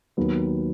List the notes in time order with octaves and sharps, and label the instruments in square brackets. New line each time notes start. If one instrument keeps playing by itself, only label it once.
[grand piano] D#2 D#3 F#3 B3